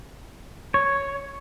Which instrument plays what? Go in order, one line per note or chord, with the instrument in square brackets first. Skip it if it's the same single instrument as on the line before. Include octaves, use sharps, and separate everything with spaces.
[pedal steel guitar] C#5